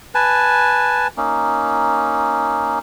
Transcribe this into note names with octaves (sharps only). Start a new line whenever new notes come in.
B4 G#5 A5
A#3 C#4 D#4